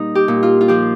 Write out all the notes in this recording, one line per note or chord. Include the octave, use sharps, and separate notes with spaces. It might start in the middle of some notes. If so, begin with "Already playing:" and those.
Already playing: A#2 G3 D#4
G4
A#2
F4
F4
F3 G4